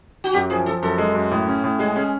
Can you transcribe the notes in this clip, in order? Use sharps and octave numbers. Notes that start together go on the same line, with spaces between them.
F#4
F#2 G4
F3 G#4
F3 A4
F#2 A4
G#3
F#2
A2
C#4
A2
G#3 G#4
C#4 G#4